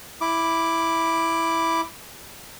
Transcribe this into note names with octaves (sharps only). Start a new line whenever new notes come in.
E4 D6